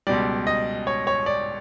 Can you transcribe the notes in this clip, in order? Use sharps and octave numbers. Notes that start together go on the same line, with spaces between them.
C#2 B2 G3 D5
D#5
C#5
C#5
D5